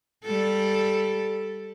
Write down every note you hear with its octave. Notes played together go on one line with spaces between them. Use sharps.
G3 A4